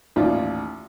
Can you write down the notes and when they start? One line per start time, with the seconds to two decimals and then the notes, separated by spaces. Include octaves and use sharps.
0.16 A1 D#2 F4 D5